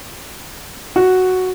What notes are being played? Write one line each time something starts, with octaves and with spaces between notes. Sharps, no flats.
F#4